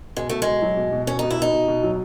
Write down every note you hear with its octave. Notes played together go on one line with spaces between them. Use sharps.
B2 G#3
B2 A3
B2 G#3
F#3
B2
B2
B2 C#4
B2 D#4
E4
B2 D#4
B2
B2
F#3